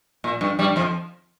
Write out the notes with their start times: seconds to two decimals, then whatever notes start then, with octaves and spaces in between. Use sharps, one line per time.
0.24 A#2
0.41 G2
0.59 G2 G3
0.76 F2 F3